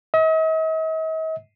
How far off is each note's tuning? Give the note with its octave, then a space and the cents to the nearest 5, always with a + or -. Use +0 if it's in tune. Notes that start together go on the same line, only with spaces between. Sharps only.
D#5 +45